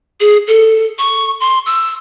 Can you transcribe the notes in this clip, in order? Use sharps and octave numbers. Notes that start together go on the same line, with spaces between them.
G#4
A4
C#6
C6
E6